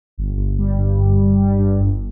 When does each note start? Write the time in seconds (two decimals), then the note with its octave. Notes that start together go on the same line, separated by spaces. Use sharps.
0.18 G1
0.37 G1
0.58 G3
0.78 G2
0.98 G1
1.18 G1
1.40 G3
1.59 G2
1.80 G1